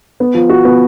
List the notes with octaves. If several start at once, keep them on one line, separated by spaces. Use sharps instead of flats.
B3
F3
F#4
B3